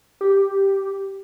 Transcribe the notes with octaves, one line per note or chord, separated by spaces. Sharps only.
G4